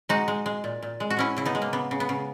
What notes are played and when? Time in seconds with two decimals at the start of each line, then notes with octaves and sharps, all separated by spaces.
0.09 G#3 D#4 F#4
0.28 G#3
0.46 G#3
0.64 A#2
0.82 A#2
1.00 G#3
1.10 F#4
1.17 G#3 C#4 E4
1.37 C#3 E4
1.45 B3 D#4
1.55 G#3
1.62 A#3
1.73 C#3 B3
1.91 C#3
2.00 B3
2.09 C#3